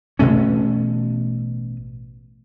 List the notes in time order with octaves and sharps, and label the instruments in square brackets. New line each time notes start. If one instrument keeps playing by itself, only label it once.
[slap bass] A1 B2 A3 C#4